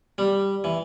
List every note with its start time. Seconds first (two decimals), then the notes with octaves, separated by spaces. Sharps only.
0.18 G3
0.64 E3